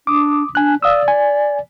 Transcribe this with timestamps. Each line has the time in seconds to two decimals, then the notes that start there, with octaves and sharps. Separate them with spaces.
0.07 D4 D6 D#6
0.55 D4 G#5 F#6
0.82 D5 F5 D#6 E6
1.08 G#5